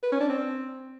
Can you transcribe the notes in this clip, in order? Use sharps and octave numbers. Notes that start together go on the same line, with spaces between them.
B4
C#4
D4
C4